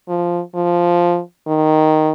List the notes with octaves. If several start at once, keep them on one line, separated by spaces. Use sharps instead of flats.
F3
F3
D#3